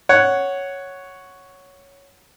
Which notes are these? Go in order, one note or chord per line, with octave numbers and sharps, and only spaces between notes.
C#5 F#5